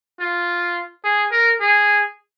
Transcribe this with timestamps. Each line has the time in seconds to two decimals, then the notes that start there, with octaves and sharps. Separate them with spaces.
0.20 F4
1.04 G#4
1.32 A#4
1.60 G#4